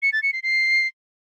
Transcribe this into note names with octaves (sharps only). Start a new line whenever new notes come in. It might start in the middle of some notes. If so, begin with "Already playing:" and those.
C#7
A6
C#7
C7
C7